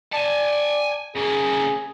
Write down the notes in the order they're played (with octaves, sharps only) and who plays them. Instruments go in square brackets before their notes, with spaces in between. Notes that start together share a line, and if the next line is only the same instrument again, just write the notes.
[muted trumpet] D5 [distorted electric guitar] G#5 A5
[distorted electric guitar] C#3 A#3 [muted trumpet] G#4